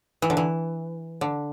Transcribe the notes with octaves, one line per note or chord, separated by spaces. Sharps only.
E3
D3
E3
D3